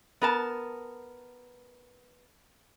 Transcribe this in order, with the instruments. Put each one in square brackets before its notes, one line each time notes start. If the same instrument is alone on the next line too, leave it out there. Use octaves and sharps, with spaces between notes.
[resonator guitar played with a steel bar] B3 A#4 A5